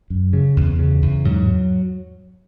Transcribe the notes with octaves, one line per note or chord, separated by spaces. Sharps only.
F#2
C#3
E2
C#3
E2
G#2 F#3